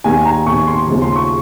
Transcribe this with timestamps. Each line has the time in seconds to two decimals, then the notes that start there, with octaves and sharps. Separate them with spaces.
0.04 D#2 D#3 G#5
0.25 A#5
0.46 D#2 D#3 C#6
0.67 C6
0.88 D#2 C#3 F3
1.02 C6
1.16 C#6